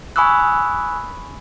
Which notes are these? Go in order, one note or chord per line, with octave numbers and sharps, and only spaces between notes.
G#5 B5 C#6 D#6 E6 F#6